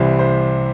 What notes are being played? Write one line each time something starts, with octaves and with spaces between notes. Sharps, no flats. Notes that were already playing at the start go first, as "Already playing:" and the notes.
Already playing: C2 C3 E3 C5
C5